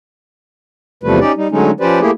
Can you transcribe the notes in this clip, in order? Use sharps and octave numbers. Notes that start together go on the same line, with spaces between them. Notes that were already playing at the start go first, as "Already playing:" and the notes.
E2 C3 F3 G3 A3 B4
C#4 D#4 G4 D5
G3 D#4
D3 F#3 G#3 A3 C#4 D#4
F3 C#4 G4 B4 C5 D5
A3 A#3 E4 G4 G#4